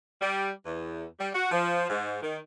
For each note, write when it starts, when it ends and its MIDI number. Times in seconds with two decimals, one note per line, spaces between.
0.21 0.50 55
0.65 1.04 40
1.19 1.29 55
1.34 1.47 66
1.52 1.86 53
1.89 2.19 44
2.21 2.37 51